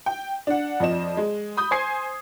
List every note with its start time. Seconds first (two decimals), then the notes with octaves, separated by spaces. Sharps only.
0.06 G5
0.47 D4 F#5
0.80 F2 F3 D5 D#5 E7
1.17 G#3
1.57 B5 D#6 G6
1.71 C5 G#5 C6 G#6 C7